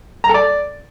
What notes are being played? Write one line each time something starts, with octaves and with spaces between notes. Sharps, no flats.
A#5
A4
D5